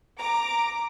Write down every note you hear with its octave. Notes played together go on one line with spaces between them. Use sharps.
A#5 D6